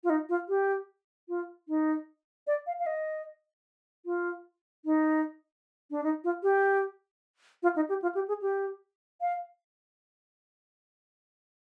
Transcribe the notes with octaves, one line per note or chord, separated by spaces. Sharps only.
F4
D#4
F4
G4
F4
D#4
D5
F5
F5
D#5
F4
D#4
D4
D#4
F4
G4
F4
D#4
G4
F4
G4
G#4
G4
F5